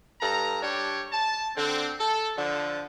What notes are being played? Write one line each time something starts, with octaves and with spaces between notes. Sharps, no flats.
G2 A4 A#5
G3 D4 G4 C#5
A5
D3 C4
A4
D3 F3